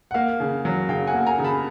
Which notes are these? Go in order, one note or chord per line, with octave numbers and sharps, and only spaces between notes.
F#5
A#3 F5
C#3
F#3
C#3 F5 G5
F#5 G#5
A#3
G#5 A#5
C#3
A5 B5